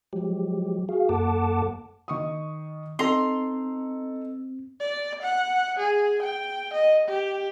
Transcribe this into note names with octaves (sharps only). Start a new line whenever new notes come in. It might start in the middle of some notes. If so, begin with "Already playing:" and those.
F3 F#3 G#3 G4
F#4 G#4 F5
F#2 A#3 A4 F#5 A5 D6
D#3 C#6 D#6
C4 D#4 A4 A#5 C6
D5
F#5
G#4
G5
D#5
G4